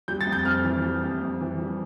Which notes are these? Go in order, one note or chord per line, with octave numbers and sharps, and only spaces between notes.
G3 G6
A6
F2
G6
F2 F6
E3
G3
F2
F2
E3
G3